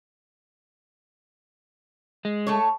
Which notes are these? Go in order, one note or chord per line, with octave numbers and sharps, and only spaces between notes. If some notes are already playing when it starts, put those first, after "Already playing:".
G#3
A3 A4 C#5